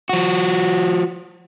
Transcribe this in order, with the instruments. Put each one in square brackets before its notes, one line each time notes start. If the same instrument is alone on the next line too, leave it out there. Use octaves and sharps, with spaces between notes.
[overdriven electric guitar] F3 F#4